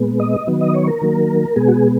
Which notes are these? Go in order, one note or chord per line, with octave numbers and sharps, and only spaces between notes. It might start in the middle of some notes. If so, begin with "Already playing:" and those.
Already playing: A#2 G#3 B3
D#5
D#3 F#3 B3
D#5
C#5
A#4
D#3 F#3 A#3
B2 G#3 B3 G#4
F#4
G#4